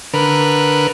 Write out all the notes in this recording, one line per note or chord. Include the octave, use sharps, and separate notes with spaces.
D3 A#4 B4